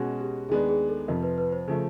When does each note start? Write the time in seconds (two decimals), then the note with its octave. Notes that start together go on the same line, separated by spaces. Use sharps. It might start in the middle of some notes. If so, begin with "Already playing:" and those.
Already playing: B2 G#3 C#4 F#4
0.21 G4
0.49 D#2 D#3 G#3 B3 D4 G#4
0.69 G#4
0.89 A4
1.08 F2 C3 F3 A#4
1.23 B4
1.38 B4
1.52 C5
1.68 C#3 F3 A3